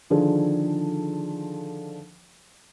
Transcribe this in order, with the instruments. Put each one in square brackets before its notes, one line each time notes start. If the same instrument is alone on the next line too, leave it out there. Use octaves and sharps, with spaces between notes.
[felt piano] D3 D#3 F3 D4 G#4 A4